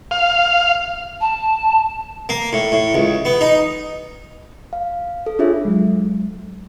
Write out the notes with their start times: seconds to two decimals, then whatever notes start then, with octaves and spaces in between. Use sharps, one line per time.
0.11 F5
1.21 A5
2.29 A#3
2.53 A2
2.72 A2
2.94 C#2
3.25 B3
3.41 D#4
4.73 F5
5.26 A4
5.39 D4 F4 G#4 C#5 E5
5.65 F#3 G#3